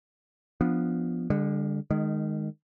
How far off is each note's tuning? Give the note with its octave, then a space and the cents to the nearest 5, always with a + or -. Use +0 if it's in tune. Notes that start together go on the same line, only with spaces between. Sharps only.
F3 +0 B3 +0 D4 +0
D3 +0 G3 +45
D#3 -20 G#3 +5